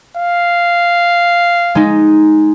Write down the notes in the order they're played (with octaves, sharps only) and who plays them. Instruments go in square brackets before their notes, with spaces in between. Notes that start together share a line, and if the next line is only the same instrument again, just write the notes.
[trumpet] F5
[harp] G#3 D#4